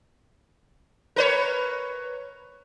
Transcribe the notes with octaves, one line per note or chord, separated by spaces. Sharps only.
A#4 B4 C#5